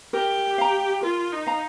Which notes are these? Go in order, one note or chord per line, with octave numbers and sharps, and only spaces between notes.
G4 A#4
F5 A#5
F4 A#4
D#4
F5 A#5